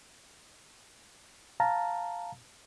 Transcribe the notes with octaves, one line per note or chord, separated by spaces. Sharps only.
F5 A5 A#5